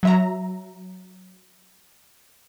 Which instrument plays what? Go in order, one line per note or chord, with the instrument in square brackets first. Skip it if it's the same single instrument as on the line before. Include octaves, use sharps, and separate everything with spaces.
[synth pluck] F#3 E5 A#5